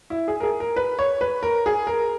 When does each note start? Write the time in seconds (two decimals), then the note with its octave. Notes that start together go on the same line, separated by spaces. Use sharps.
0.10 E4
0.28 G#4
0.40 A#4
0.43 G#4
0.60 A#4
0.76 B4
0.99 C#5
1.21 B4
1.43 A#4
1.66 G#4
1.87 A#4